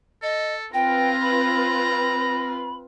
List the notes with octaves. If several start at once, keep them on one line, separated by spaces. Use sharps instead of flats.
A4 D#5
C4 F4 B4 G5 A#5
B5